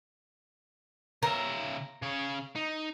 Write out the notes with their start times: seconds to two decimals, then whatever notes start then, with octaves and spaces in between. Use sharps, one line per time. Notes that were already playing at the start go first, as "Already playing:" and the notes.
1.23 C#3 A#4 E5
2.02 C#3 C#5
2.56 D#4